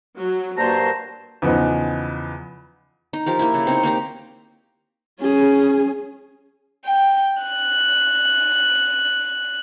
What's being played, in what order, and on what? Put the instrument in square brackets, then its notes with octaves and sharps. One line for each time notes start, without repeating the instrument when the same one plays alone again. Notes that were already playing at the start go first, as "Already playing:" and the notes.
[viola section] F#3
[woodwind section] G2 C5 [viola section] F#3 A#3 [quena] A5 [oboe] A#5
[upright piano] E2 C#3 F3 B3 D#4
[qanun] D#4
F3 G4 A#4
A#3 E4
C#3
C4 D#4 C#5
A#3 C4 G4 A#5
[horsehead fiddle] C#4 G#4
[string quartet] G5
F#6